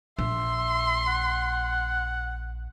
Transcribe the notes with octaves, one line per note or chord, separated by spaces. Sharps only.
A#1 E5 C6
F#5